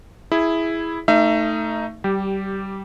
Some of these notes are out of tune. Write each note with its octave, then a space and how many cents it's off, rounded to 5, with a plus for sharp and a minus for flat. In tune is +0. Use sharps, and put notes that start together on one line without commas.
E4 +0 G#4 +0
A3 +15 D#4 +0 E5 +35
G3 -20 G4 +0